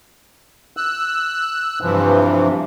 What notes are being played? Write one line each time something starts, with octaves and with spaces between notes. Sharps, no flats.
E6 F#6
G2 C3 E3 F3